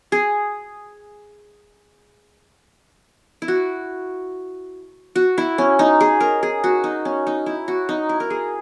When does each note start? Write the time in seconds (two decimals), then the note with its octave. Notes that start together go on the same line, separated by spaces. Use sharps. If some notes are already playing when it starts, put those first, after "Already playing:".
0.12 G#4
3.42 E4
3.48 F#4
5.16 F#4
5.38 E4
5.58 C#4
5.79 D#4
6.01 G#4
6.20 A#4
6.43 G#4
6.64 F#4
6.84 D#4
7.05 C#4
7.27 D#4
7.46 E4
7.68 F#4
7.89 D#4
8.09 E4
8.20 A#4
8.30 G#4